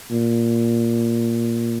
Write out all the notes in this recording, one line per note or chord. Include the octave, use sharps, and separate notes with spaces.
A#2